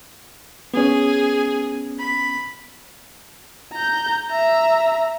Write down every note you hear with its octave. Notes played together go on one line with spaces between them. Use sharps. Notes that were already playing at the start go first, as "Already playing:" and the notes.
B3 C#4 G#4
B5
A#5 G6
E5 A#5